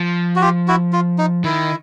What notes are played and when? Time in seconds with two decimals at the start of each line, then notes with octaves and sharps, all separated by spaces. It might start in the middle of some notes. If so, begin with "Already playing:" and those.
Already playing: F3
0.36 F#4
0.41 F4 G4
0.68 E4 F#4
0.93 F4
1.18 D#4
1.44 D#3 E4